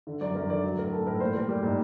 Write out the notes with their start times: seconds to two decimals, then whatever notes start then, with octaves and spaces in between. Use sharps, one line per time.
0.07 D3
0.21 F#2 D5
0.35 F#2 A#4
0.50 D3 D5
0.63 F#3
0.78 A2 A#4
0.92 A2 A4
1.07 A2 A#4
1.20 A#2 C5
1.34 G3 A#4
1.49 G3 G4
1.63 A#2 D#4